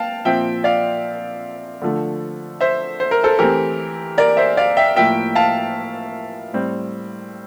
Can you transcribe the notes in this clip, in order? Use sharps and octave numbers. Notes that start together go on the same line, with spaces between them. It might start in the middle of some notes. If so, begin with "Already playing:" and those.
Already playing: F5 G5 A5
A#2 F3 C4 E5 G5
D5 F5
D3 F3 A3
C5 E5
C5
A#4
A4 C5
E3 A3 C4 G4 A#4
A#4 D5
C5 E5
D5 F5
E5 G5
A2 F3 A#3 E5 G5
F5 A5
A2 G3 C4